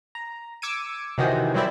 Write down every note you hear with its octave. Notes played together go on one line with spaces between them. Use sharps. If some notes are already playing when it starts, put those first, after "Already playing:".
A#5
D6 E6 G#6 C#7 D#7
C3 D#3 E3 F#4 G#4 C5
F#3 G3 C4 E4 D5